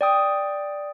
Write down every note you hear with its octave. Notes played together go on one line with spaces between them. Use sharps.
D5 G5 D#6